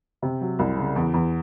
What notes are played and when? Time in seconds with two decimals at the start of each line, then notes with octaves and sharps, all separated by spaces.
0.22 C3
0.41 F#3
0.59 C2
0.78 C#3
0.96 E2
1.14 E2